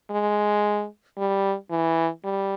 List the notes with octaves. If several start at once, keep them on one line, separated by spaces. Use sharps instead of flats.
G#3
G3
E3
G3